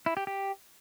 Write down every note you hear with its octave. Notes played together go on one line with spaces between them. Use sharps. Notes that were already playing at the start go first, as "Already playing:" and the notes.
E4
G4
G4